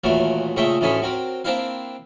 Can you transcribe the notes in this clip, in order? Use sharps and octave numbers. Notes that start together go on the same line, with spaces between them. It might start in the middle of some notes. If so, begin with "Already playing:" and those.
D#2 A#2 E3 F#3 A3
A#2 C#3 A3 D#5 E5 G5
A1 D2 D3 C#4 D#4 B5
F#3 C4 A#4
A#3 C4 D4 E4 F5